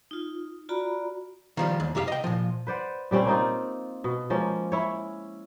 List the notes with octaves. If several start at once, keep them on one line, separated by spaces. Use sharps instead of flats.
D#4 F4
F4 F#4 D5 A#5 B5
D#3 F3 G3
D#2
C2 F#2 G4 E5 F5
D#5 G5
A#2 F3
B4 C5 D5 F#5
A#2 G3 C4 C#4
A#3 C4 D#4 F4
B2
F3 G#3 A#3 C#4
C#4 E4 C#5